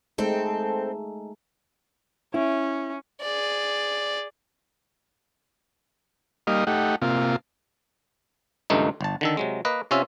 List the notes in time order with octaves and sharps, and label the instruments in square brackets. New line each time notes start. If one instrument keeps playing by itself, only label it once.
[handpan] G#3 A3 D#4 [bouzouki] C4 A4
[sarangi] C#4 [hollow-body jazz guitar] E4
[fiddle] G#4 D5
[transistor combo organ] G3 A#3 D#4 D#5 F5
A3 D#4 G4 F#5
C3 A#3 F4
[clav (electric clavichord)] C#2 G2 D#3 A3 A#3 D#4
G1 A5
D3 D#3 A4
C3 F#3 G#3
A#3 B4 D#5
C3 C#4 F4 E5